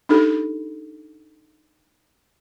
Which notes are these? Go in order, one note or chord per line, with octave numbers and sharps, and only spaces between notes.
D4 D#4 G4 A4 B5